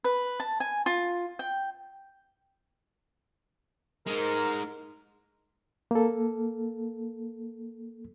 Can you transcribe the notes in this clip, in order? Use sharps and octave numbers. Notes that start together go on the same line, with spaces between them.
B4
A5
G#5
F4
G5
G#3 D#4 A#4
A#3 A4